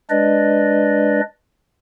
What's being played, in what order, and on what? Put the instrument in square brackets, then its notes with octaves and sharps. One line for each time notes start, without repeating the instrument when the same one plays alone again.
[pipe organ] G#3 D4 B4 D5 D#5